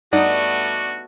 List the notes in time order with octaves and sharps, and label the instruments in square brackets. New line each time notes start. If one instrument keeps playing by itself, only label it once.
[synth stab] G2 D#4 D#6 [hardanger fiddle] A3 B3 [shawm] F#4 [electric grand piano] D5 F#5